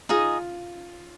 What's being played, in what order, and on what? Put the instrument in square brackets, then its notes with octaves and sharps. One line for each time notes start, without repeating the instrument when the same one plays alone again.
[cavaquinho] D#4 G#4 D#5 [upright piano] F4